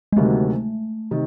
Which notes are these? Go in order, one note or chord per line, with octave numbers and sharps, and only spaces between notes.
G#3
D2 C3 D#3 F#3 A3 A#3
C3 D#3